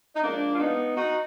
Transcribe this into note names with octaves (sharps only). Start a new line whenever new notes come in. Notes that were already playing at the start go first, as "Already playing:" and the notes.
D#4
G#2 F3 A#3 D4
F4
B3 D#4
D#4 F#4